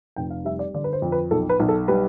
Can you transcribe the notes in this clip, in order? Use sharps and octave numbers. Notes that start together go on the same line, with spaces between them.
F1 G5
F5
G3 E5
D5
D3 D5
B4
C5
F2
B4
B1 A4
B4
B1
A4
G3 B4